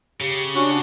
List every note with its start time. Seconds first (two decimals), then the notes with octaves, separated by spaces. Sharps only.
0.21 C#3 G4
0.55 C#4 D4 F#4